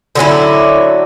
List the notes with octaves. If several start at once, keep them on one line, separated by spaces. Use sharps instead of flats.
D3 F#3 C#4 E4